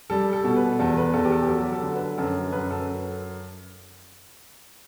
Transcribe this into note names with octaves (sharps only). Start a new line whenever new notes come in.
G3 A4
A4
B2
B4
E2 A4
B4
E2 A4
G4
A4
G4
F#3 A4
A4
D3
B4
F#2 A4
F#2 B4
A4